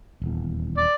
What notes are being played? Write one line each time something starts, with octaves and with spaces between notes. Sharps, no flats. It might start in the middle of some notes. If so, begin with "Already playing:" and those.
D#1 E2
D5